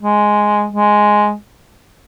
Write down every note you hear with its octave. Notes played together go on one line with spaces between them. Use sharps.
G#3
G#3